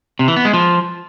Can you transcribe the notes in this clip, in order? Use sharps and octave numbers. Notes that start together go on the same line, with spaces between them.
C3
E3
B3
G#3
F3